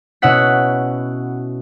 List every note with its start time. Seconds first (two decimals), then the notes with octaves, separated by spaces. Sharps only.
0.22 B2 C#4 E4 F#5 B6